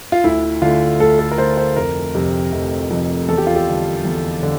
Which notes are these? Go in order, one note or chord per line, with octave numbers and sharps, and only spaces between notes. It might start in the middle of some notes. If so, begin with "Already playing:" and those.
F4
D2 E4
D3 A3 F4
D2 A4
A4
A#4
D3 A3 C5
C5
F1 A#4
F2 C3
F1
F2 C3
E2 A4
G4
F4
G4
D3 G3
E2
D3